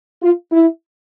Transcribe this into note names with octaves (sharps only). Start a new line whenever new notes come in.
F4
E4